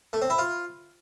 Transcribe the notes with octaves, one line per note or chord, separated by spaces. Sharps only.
A3
C4
E4
F4